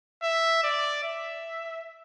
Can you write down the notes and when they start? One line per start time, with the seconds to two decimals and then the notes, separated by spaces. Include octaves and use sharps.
0.23 E5
0.64 D5
1.03 E5